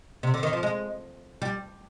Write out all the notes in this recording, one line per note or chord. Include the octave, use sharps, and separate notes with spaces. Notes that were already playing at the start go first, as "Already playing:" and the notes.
C3
D3
D#3
F3
G#3
G3